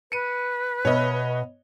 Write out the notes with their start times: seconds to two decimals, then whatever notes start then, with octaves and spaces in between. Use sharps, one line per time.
0.12 B4 C#7 D#7
0.85 B2 C#5 D#5 E5